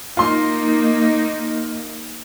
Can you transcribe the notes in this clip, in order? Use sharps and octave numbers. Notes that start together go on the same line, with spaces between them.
A#3 D#4 F4 C6